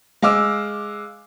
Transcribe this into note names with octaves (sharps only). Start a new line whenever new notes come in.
G#3 F5 D6 E6